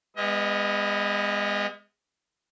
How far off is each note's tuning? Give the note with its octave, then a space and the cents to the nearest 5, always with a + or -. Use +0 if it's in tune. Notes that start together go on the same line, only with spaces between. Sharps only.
G#3 -35 B3 +10 D#5 +30